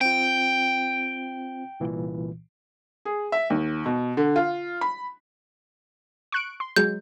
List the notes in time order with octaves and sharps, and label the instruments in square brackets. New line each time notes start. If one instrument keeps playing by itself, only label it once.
[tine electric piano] C4 F4 [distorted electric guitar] G5
[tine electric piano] C2 A#2 E3
[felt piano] G#4
E5
D#2
B2
D3
F4
B5
[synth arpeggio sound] C#6 F#6 D7
C6
[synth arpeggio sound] F#3 G#3 [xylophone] G6